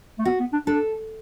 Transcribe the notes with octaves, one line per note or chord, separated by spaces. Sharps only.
A3
B3 F#4
B3
D4
D4 A4